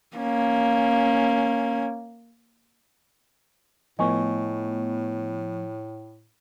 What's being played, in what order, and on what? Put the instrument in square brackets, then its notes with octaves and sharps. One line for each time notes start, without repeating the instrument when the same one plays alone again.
[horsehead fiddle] A#3 C#4
[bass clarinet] A2 [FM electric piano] F3 A3 B3 [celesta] D#5 G#5 C#6